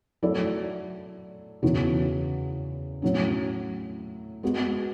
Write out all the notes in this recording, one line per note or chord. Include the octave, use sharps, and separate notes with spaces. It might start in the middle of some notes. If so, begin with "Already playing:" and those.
F#3 A3 E4 A4 D5
E2 C#3 E3 B3 F#4
A2 F#3 C#4
G#3 B3 F#4